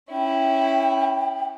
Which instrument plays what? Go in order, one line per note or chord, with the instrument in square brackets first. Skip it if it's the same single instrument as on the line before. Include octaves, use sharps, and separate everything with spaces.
[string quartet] C#4 E4 [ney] G5